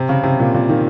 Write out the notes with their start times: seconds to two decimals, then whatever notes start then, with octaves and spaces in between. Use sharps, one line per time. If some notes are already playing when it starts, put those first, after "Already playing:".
Already playing: C3
0.09 C#3
0.23 C3
0.39 A#2
0.54 A#2
0.69 D#3